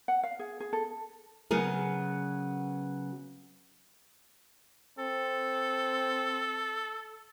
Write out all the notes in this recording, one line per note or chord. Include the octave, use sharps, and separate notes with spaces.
F#5
F5
G#4
G#4
A4
C#3 F#3 B3 G#4 A#4
C4 A4